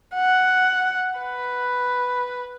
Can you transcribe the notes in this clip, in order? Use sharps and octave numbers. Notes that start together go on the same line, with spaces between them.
F#5
B4